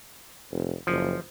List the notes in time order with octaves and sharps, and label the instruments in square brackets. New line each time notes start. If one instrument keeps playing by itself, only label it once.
[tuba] F1
[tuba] F#1 [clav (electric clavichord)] F3